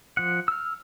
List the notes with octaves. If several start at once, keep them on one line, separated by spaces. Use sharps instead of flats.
F3 F#5
E6 F6